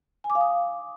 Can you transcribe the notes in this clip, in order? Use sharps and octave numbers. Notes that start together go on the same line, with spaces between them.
G#5
D6
F5
D#6